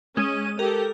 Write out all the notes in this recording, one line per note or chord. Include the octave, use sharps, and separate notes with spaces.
G#3 C#4 D#7
G4 A4 A#4